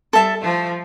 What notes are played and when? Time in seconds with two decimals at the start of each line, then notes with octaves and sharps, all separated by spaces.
0.13 G3 A4 E5 A5
0.42 F3 A3